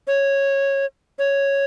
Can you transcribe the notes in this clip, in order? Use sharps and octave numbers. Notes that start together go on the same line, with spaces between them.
C#5
C#5